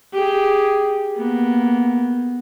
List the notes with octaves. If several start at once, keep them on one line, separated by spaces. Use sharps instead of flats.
G4 G#4
A#3 B3